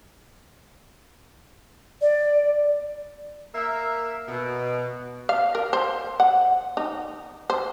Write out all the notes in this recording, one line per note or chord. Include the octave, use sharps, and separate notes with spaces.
D5
A#3 A#4 E5
B2
F5
A#4
C5
F#5
D#4
C5